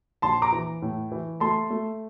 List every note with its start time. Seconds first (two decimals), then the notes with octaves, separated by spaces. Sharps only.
0.22 A#1 A5 C6
0.42 A#5 D6
0.52 E3
0.82 A2
1.12 E3
1.40 A3 A5 C6
1.70 A3